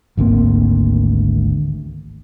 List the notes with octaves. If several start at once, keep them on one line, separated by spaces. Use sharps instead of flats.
G#1 D2 A#3 C4